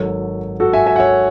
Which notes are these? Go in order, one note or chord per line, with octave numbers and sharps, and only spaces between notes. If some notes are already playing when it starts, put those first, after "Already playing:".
Already playing: G#1 G#2 F#3 A4 C#5
F#4 A4
E5 G#5
E5 G#5
F#5
C#5 E5